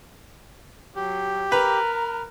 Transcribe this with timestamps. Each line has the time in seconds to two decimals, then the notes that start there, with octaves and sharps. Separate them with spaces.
0.96 F#3 G4
1.52 A#4 B4 A#5